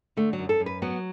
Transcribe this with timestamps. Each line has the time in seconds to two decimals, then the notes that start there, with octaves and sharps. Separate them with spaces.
0.17 D3 A3
0.33 F#3
0.39 F#2
0.49 A4
0.60 F#2
0.66 B4
0.82 F#3 B3